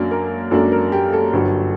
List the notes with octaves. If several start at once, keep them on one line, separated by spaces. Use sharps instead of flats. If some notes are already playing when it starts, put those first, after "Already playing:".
Already playing: F#2 F#3 A#3 D4
A#4
F#2 F#3 A#3 D4 A4
A#4
G4
A4
G1 G2 F#3